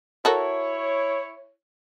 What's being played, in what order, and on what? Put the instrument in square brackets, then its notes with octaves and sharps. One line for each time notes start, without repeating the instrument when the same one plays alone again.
[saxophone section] E4 C#5 [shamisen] F#4 A4 A#4